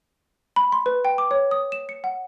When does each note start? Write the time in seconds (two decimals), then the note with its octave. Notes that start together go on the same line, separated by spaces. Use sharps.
0.56 B5
0.72 C6
0.86 B4
1.05 G5
1.18 D6
1.31 C#5
1.51 D#6
1.72 E7
1.89 C#7
2.04 F#5